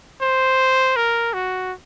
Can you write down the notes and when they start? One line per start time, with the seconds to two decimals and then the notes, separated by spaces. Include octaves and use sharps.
0.22 C5
0.96 A#4
1.33 F#4